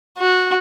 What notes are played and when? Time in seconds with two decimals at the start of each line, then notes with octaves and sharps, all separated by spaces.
0.18 F#4